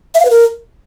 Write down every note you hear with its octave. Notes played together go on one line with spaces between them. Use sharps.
E5
F5
B4
A#4